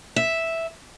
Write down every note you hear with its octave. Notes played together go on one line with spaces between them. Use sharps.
E5